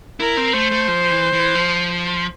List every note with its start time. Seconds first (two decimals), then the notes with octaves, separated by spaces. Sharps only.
0.20 E4 A#4
0.37 C4
0.53 A3 C5
0.71 A3
0.88 F3
1.10 E3
1.33 E3
1.55 F3